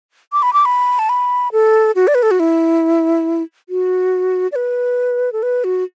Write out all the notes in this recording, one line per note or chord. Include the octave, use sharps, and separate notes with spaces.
D6
B5
D6
B5
A5
B5
A4
F#4
D5
B4
A4
F#4
E4
F#4
D5
B4
A4
B4
F#4